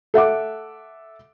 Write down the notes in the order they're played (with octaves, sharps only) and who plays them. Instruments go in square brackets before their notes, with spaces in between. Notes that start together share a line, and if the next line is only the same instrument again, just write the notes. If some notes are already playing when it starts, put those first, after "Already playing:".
[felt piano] A4 E5 F#5 D6